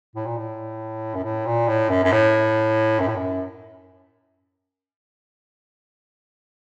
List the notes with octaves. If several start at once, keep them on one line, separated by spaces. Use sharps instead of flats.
A2
A#2
A2
F#2
A2
A#2
A2
F#2
F#2
A2
F#2
A2
F#2